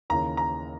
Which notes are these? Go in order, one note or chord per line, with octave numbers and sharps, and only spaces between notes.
D#2 C#3 E3 A#5
A#5